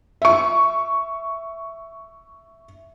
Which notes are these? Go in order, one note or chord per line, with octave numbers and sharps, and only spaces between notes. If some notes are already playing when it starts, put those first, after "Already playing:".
E5 C#6